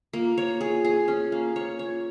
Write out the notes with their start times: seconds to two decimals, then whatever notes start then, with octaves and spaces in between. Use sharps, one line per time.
0.13 A#3 F4
0.38 C#5
0.61 G#4
0.84 G#4
1.08 C#4
1.32 A#3
1.56 C#5
1.79 C#5